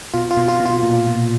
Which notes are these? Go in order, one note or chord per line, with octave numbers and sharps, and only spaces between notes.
B2 F4
F4
B2
F4
B2
F4
A#2
A#2